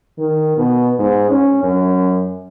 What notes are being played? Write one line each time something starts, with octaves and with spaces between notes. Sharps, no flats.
D#3
B2
G#2
C#4
F#2